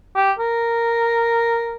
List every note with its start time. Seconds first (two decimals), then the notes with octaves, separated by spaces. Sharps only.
0.16 G4
0.39 A#4